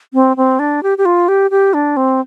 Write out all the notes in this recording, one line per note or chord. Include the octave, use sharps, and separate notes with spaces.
C4
C4
D4
G4
G4
F4
G4
G4
D4
C4